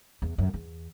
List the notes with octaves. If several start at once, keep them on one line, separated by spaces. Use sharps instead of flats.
E2
F#2
E2